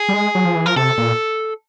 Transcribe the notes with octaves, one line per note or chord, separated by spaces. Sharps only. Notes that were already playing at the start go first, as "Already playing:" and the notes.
Already playing: G#4
G3
G#3
F#3
F3
E3
F3 A#4
C3 A4
A#2